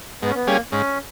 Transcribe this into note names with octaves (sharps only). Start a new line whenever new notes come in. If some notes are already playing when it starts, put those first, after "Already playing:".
G#2 B3
C#4
B3
G3 A#3 C#4 G#4
G#2 C#4